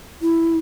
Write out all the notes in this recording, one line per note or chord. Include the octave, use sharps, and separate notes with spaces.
E4